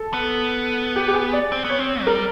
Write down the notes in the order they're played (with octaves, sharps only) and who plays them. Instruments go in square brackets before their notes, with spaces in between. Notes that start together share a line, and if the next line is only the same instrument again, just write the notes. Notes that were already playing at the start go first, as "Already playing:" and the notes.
Already playing: [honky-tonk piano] A4
[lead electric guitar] B3
[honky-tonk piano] G4
G4
G#4
D5
[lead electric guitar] C4
B3
[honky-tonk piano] C#5
[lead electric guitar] C4
F#3
[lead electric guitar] G3 [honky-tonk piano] A#4